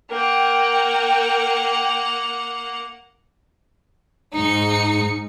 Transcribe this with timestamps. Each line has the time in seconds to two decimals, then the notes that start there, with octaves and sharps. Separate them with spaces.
0.11 A#3 A#4 F#5 G5
4.34 G#2 D#4 C#7